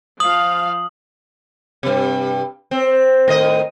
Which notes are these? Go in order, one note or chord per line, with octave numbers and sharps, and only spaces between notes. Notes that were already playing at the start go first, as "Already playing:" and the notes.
F3 F5 D#6 F#7
G2 C3
C4
A2 D#3 D#5